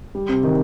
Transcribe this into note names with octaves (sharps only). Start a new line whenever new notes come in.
G3
C3
D#3